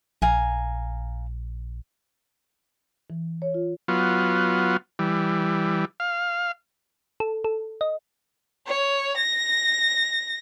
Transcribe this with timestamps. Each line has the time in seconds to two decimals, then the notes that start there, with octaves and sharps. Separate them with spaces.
0.22 A#1 F5 G#5 A#5
3.10 E3
3.42 C#5
3.54 F4
3.88 F#3 B3 F4
4.99 E3 G3
6.00 F5
7.20 A4
7.44 A4
7.81 D#5
8.67 C#5
9.17 A#6